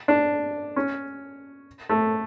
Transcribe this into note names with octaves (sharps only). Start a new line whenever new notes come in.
D4
C#4
A3